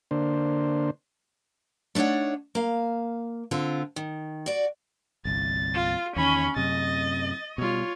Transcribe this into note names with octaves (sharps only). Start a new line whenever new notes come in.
D3 A#3 D4 C5
A3 D4 D#4 C#5 F#5
A#3 F5
D3 C4 F4
D#3
F#4 D5
G1 C2 A6
F4
E2 D#3 C#4 B5
F#2 C3 D#5 A6
B2 G3 F4 C#5